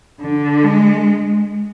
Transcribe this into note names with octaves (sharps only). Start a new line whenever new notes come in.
D3
G#3